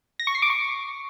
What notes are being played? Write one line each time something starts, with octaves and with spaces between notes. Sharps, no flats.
A#6
C#6
C7
D6
C#6